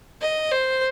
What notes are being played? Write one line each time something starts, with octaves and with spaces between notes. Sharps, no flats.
D#5
C5